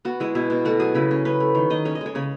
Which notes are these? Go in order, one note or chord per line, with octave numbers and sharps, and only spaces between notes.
B3 F#4
G#3 E4
B2 E4
B2
A3 F#4
F#3 G#4
C#3 E4
C#4
C#4 B4
A3
D#3
D#3 D#5
C#4 C#5
D#5
G#3 C#5
C#3 C#5